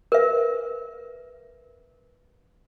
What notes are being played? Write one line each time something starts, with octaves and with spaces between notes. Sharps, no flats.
A#4 B4 E5